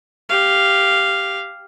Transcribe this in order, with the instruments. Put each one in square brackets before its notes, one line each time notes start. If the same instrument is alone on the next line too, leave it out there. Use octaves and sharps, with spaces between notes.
[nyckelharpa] G4 F5